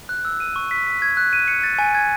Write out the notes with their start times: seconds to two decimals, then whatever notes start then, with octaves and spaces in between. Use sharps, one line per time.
0.09 F#6
0.25 E6
0.40 D#7
0.56 C#6
0.71 B6
0.86 B6
1.02 G#6
1.17 F#6
1.33 D#7
1.48 C#7
1.63 A6
1.79 G#5
1.95 G#6